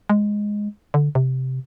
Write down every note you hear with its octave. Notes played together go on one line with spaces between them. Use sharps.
G#3
D3
C3